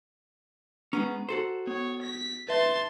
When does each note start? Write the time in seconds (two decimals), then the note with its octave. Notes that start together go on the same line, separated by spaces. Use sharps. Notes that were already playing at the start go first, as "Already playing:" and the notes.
0.93 G#3 B3 C#4 A#5
1.29 F#4 A4 C5
1.67 B3 C#5
2.03 B6
2.48 B4 E5 A5 C6